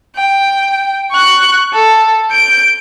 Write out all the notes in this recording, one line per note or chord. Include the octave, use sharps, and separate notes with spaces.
G5
C#6 F#6
A4
G6 D7